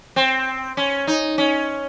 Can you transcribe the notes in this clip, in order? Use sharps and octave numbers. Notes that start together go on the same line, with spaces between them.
C4
C#4
D#4
C#4